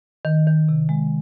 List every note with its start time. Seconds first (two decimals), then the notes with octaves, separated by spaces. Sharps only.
0.25 D#3
0.47 D#3
0.69 C3
0.89 G#3